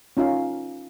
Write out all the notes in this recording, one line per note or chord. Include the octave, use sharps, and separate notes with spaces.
C#4 D#4 F4 F5